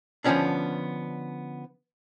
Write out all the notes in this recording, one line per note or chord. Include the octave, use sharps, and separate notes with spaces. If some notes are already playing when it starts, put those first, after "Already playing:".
D3 F3 G3 B3 C#4 D4